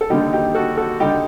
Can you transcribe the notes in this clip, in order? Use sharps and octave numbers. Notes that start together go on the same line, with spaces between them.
A4
D#2 D3 G3 D#4 G4
D#4 G4
F#4 A4
F#4 A4
D3 G3 D#4 G4